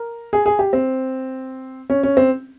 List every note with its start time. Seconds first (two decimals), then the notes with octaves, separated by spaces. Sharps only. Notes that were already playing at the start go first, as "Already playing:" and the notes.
Already playing: A#4
0.33 G#4
0.46 G#4
0.59 G4
0.73 C4
1.90 C#4
2.03 C#4
2.17 C4